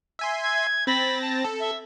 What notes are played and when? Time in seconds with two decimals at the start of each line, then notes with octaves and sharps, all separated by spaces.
0.19 E5 G#5 C6
0.43 G#6
0.87 C4 B5 A6 A#6
1.22 A5
1.44 A4
1.60 E5